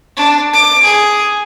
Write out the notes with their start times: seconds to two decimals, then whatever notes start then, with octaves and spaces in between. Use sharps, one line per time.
0.17 D4
0.53 D6
0.83 G#4